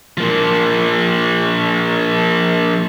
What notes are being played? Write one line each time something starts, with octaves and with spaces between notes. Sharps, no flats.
F3 A#3